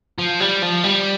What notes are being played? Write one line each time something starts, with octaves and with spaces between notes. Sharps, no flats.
F3
G3
F3
G3